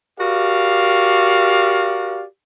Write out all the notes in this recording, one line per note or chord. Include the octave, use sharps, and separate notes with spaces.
F#4 G4 A#4 D5 F5